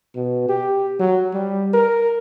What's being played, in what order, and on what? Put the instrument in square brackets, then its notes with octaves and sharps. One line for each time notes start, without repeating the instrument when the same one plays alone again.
[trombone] B2
G4
F#3
G3
A#4